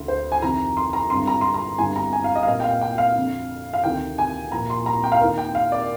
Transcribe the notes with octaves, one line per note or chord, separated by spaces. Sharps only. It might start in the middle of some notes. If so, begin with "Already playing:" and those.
Already playing: D2 D3
C5
G#5
F1 F2 C3 D#3 A#5
C6
A#5
G#1 G2 D3 C6
A#5
C6
A#5
G1 G2 D3 G#5
A#5
G#5
F5
D#5
F5
C2 A#2 D#5
G5
F5
G5
F5
F1 F2 D3
F5
D2 C3 D#3 G5
G#5
A#1 A#2 A#5
C6
A#5
G5
F5
D#2 D#3
G5
F5
D5